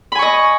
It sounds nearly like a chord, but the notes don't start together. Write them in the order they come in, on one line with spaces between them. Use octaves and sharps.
B5 G#5 C#6 D#5